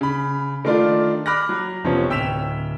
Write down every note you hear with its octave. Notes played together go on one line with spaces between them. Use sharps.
C#3 B5
D#3 A3 D4 F4 D5
B5 D6 F6 F#6 A#6
F#3
F1 F3 B3 C#4 C#5
D1 G5 E6 B6 E7 F7